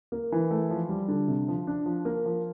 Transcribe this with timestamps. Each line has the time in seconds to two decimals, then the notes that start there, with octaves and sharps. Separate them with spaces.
0.12 A#3
0.32 E3
0.51 A3
0.71 F3
0.89 G3
1.08 D3
1.28 C3
1.48 F3
1.67 D4
1.86 F3
2.05 A#3
2.25 F3